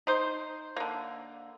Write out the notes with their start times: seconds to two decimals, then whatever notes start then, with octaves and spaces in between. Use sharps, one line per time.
0.07 D#4 C5
0.76 D3 A#3